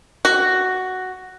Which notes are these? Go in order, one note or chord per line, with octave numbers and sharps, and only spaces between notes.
F#4